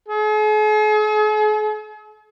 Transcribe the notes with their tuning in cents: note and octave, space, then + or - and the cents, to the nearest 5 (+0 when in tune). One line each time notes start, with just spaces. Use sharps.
G#4 +45